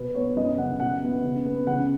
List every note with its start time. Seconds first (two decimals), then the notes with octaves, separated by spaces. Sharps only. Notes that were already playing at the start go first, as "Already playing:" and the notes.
Already playing: B2 B4
0.15 B3 C#5
0.36 F#2 D#5
0.49 D#5
0.58 C#3 F#5
0.80 B2 F#5
1.03 B3
1.23 C#3
1.46 B3
1.67 C#3 F#5